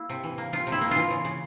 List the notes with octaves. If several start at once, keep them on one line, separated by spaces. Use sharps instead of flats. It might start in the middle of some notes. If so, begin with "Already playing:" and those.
Already playing: A#3 E4
C3
E3
A#3
C3 F4
C3
E4
A#3
E3 F4
C#3
C#3